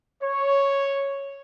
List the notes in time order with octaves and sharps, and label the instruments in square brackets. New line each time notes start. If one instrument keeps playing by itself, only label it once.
[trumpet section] C#5